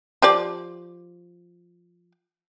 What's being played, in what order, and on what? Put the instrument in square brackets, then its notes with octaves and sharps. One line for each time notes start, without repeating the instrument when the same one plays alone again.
[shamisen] F3 G4 D5